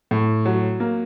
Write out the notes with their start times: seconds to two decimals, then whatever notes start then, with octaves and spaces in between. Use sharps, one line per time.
0.11 A2
0.46 F#3
0.80 A#3